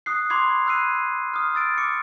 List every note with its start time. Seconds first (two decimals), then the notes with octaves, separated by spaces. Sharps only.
0.06 D#6 F#6 C7
0.30 B5 C6 D6 G#6 C7
0.66 B5 E6 F#6 G#6 C7 D#7
1.34 D#6 F6
1.55 E6 A6 D7
1.78 D6 C#7